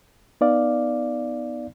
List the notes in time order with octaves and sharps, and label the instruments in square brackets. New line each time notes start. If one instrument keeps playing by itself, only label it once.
[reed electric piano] B3 D#4 D5 F5